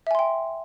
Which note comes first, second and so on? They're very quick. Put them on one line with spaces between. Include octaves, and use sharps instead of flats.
E5 G#5 C6 G5